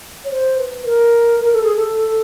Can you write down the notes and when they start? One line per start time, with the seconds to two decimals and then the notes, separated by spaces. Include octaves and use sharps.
0.25 C#5
0.31 C5
0.58 B4
0.85 A#4
1.40 A#4
1.53 A4
1.64 G#4
1.76 A4